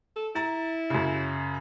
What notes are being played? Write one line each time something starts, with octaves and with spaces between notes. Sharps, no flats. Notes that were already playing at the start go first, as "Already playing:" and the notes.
A4
E4 A#5 A6
F#2 C#3